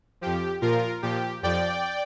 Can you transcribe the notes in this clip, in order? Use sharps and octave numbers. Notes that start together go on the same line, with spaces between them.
F2 F3 G4
A#2 F3 F4 A#4
A#2 F3 G4
F2 F3 D5 G5